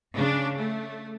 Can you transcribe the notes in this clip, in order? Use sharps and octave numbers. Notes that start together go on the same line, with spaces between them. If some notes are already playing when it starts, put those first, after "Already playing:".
C#3 D4
A3